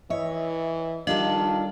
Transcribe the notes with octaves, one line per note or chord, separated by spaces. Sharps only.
E3 C#5 D#5 E5
D#3 G3 D4 F4 G4 A4 D#5 F5